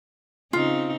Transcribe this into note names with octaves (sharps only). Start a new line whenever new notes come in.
C#3 C4 D#4 F4